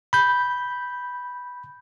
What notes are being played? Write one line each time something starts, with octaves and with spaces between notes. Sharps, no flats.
B5 G6